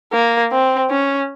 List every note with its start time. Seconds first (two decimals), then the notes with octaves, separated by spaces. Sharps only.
0.13 A#3
0.51 C4
0.90 C#4